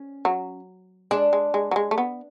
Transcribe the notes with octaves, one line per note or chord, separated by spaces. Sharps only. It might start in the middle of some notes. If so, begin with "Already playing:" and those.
Already playing: C#4
F#3
G#3 D4
G#3
G#3
F#3
G#3
A3
B3